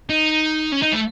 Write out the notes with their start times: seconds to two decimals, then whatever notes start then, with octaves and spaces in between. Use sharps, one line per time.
0.09 D#4
0.72 C#4
0.83 D#4
0.93 A3